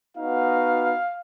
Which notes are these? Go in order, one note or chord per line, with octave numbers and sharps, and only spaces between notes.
B3 D#4 F#4 F5